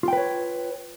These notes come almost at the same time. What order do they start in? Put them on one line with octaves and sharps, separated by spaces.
F4 G5 B4 C#5